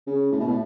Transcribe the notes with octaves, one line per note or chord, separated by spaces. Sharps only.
C#3
A2
B2
A2